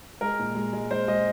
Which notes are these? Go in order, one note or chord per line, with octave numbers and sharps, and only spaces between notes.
G#3 A#4
A#2
G#3
G#3
G#3 C5
G#3 D#5